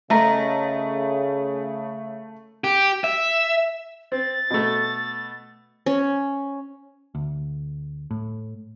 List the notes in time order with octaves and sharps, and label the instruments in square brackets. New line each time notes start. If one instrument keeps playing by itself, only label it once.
[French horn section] C#3 [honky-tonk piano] A3 [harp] A#4 D#5 A#5
[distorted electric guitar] G4
E5
[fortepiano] C4 [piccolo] A6
[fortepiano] B2 A3
[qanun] C#4
[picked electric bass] D2
A2